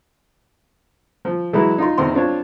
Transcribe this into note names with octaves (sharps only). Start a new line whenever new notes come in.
F3
E3 F#3 G#3 E4
D#4 F4 C6
E2 D#3 C4 C6
C4 D4 F4 C#5